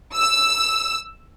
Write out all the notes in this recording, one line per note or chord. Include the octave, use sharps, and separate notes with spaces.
E6